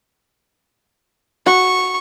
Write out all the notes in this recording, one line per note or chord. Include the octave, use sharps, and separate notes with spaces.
F#4 C#6